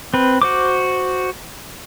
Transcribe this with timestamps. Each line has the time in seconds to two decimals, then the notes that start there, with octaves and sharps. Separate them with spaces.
0.14 C4 B4
0.42 F#4 C5 D6